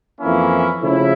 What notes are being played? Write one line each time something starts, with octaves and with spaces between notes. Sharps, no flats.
F2 E3 A#3 C#4 E4
C#3 F3 A3 E4